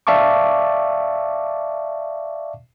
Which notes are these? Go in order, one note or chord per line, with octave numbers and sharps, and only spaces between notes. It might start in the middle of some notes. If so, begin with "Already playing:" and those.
D5 E5 F5 A5 C#6 D6